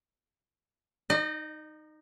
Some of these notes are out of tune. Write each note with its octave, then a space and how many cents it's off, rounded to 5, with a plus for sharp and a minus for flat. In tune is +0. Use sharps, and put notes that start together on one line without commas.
D#4 -5 D#5 -40